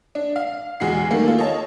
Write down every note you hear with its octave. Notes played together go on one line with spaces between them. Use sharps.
D4
F5
E2 G#3 F#4 C7
D#3 G3 A3 A#3
F4 A4
C#5 D#5 A5